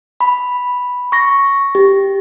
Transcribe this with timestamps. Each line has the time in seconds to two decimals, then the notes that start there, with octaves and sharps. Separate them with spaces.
0.20 B5
1.12 C#6 A#6
1.75 G4